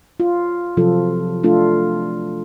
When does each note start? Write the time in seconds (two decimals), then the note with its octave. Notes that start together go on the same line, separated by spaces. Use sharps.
0.20 F4
0.77 C3 F3 F#3 F4 A4
1.44 A3 D4 F4 A4